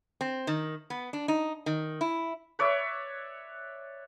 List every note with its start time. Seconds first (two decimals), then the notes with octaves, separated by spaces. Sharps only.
0.21 C4
0.47 D#3
0.90 B3
1.13 D4
1.28 D#4
1.66 D#3
2.01 E4
2.59 B4 C#5 D5 E5